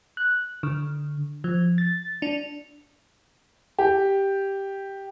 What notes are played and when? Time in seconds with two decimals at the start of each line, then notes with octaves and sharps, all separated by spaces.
0.17 F#6
0.63 D3
1.44 F3
1.78 A6
2.22 D4
3.79 G4